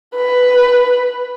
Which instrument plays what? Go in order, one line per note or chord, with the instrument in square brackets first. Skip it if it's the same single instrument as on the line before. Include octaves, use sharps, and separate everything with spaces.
[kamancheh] B4